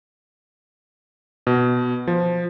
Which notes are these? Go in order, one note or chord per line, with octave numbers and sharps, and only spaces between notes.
B2
F3